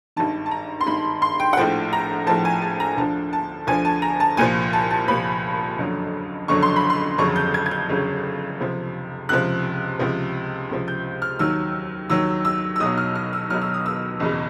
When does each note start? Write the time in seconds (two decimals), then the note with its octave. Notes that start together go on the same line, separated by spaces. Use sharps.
0.16 G#1 G2 D#3 A5
0.46 A5
0.51 A#5
0.81 C6
0.86 G#1 G2 D#3 B5
1.22 C6
1.40 G5
1.53 F#5
1.57 A#1 A2 F3 G5
1.93 A#5
2.27 A#1 A2 F3 A5
2.45 G#5
2.62 A5
2.80 A#5
2.97 D2 D3 F3 A5
3.33 A5
3.67 D2 D3 F3 G#5
3.85 A5
4.02 A#5
4.20 A5
4.37 C2 A#2 F3 G#5
4.73 A5
4.90 A5
5.08 C2 A#2 F3 B5
5.78 F#1 F2 D3 F#3
6.48 F#1 F2 D3 F#3 C#6
6.62 C6
6.76 B5
6.90 C6
7.18 G1 F2 C#3 F#3 C#6
7.36 G6
7.54 G#6
7.66 G#6
7.71 G6
7.89 G1 F2 C#3 F#3
8.60 C#2 C3 F3
9.29 C#2 C3 F3 F#6
9.99 C#2 C3 F3
10.70 C#2 C3 F3
10.88 G6
11.22 F6
11.39 D#2 D#3 F#3 E6
12.10 D#2 D#3 F#3 E6
12.45 E6
12.76 E6
12.80 B1 B2 F#3 D#6
12.97 F6
13.15 F6
13.33 E6
13.50 B1 B2 F#3 F6
13.62 E6
13.74 D#6
13.86 E6
14.20 F#1 E2 B2